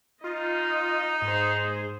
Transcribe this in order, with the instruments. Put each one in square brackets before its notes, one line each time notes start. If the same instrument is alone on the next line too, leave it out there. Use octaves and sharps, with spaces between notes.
[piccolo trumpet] D#4 [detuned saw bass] F4 [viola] D#5
[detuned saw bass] G#2 [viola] G#4 C5